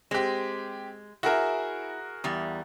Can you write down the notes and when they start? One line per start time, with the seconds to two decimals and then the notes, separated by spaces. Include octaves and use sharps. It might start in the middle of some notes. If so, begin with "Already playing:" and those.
0.11 G#3 C4 G4
1.23 E4 F#4 G#4 A#4
2.24 E2 G3